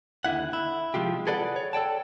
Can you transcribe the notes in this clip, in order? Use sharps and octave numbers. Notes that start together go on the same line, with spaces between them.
D#2 D3 E4 F#5
E4
C3 F3 G#3 F4 G4
G#4 A4 B4 D5 F#5
C#5
A4 D5 G5 A5